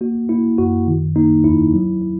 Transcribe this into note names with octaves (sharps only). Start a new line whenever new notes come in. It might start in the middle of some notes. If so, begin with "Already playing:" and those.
A#3 F#4
A#3 E4
F#2 F#4
D#3
A#3 D#4
E2 E4
F#3
F#3